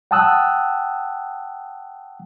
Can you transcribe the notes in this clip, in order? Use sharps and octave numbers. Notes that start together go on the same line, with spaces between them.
F#5 G5 A5 D#6 E6 F#6